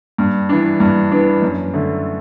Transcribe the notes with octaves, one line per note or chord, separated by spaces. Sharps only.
G2
E3 B3 D4
G2
E3 B3 D4
F#2
D3 A3